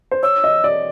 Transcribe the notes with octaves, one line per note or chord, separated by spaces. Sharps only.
C5
C#5 E6
D#5
D5